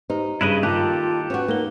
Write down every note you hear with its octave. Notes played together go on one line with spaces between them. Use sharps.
D#4 G4 B4 C5
G2 C#3 E4 B4 D#5 D#7
D#3 A#3 F4 G4 A4 A5 D6 F#6
C#4 F#4 B4
A#3 D#4 A#4 G7